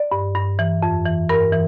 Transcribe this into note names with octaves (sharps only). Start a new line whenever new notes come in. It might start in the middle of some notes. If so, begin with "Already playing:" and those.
Already playing: D5
G2
G2
E3
F2
E3
G2 A#4
E3